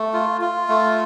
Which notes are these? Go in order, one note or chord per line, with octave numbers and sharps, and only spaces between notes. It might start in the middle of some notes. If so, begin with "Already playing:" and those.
Already playing: A3
F4
F4
A3